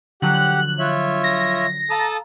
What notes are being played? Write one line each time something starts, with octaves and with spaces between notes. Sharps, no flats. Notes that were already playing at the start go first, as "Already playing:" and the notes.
D3 F3 F#3 G4 F#5 F#6
F4 C#5 E5
A#6
A4 F5 A5 A#5 D#6 A6